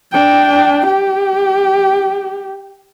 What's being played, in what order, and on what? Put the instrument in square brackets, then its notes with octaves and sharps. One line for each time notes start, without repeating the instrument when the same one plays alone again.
[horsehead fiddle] D4 G5
G4